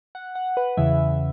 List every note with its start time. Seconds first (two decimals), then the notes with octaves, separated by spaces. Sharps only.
0.15 F#5
0.35 F#5
0.57 B4
0.77 E2 C#3 E3 E5